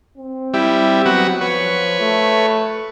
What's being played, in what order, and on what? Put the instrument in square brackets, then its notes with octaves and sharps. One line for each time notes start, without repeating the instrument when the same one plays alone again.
[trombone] C4
[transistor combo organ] G3 E4
F#3 B3 F#4
[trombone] F3 [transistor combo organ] B4 C#5
[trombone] A3